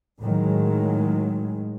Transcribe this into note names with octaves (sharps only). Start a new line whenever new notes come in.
A2 D#3 F#3 G#3